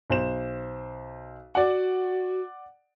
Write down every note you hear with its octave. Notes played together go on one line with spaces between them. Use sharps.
B1 C5 E7
F#4 D5 F#5